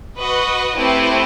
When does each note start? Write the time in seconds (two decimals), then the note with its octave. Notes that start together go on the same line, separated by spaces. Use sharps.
0.19 F#4 B4 D#5
0.77 A3 C4 E4 G4 B4